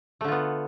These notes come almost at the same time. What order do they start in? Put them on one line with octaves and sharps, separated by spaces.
A3 D3 F4 B3